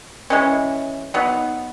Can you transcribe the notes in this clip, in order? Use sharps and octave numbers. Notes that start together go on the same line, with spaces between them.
E3 G#3 C#4
F#3 B3 D#4